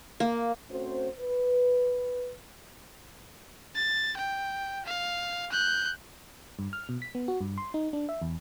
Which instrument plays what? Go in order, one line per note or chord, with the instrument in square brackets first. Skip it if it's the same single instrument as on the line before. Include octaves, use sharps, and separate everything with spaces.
[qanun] A#3
[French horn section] A3 C4 C#4 F#4 C5
B4
[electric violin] A6
G5
F5
F#6 G6
[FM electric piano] G2
F6
B2
B6
B3
F#4
G2
C6
D#4
D4
E5
E2